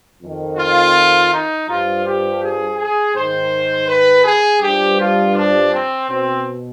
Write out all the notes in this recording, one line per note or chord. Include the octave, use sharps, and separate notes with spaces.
F2 D#3
F4
D#4
G2 F3 F4
G4
G#4
G#4
G#2 D#3 C5
B4
G#4
G2 F3 G4
F4
D4
C4
B2 C4